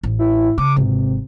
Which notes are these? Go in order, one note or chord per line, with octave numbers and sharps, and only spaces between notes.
A1
E4
C#3 D6
G#1 C3